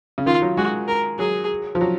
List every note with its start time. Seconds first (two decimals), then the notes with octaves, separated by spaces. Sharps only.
0.18 C#3
0.26 D#3 F4
0.42 F#3
0.57 G#3 F#4
0.88 A#4
1.19 F#3 G#4
1.75 F3
1.81 F#3